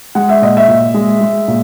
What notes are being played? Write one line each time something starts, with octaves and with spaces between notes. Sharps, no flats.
G#3 F#5
E5
A#2 D#5
E5
A#2
G#3
G#3
A#2